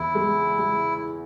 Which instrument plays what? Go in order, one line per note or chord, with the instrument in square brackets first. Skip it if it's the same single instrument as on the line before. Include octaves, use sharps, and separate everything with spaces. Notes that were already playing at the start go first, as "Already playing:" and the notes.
Already playing: [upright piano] E2 [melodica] E4
[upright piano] G#3
G#3